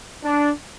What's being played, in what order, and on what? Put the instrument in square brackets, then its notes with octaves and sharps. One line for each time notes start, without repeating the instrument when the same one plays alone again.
[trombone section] D4